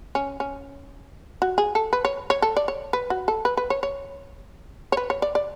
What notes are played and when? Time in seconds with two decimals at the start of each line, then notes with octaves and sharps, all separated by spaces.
0.15 C#4
0.40 C#4
1.42 F#4
1.58 G#4
1.75 A4
1.93 B4
2.05 C#5
2.30 C#5
2.42 A4
2.57 D5
2.68 C#5
2.93 B4
3.10 F#4
3.28 A4
3.45 B4
3.57 B4
3.70 C#5
3.83 C#5
4.92 C#5
4.97 B4
5.10 C#5
5.22 D5
5.35 D5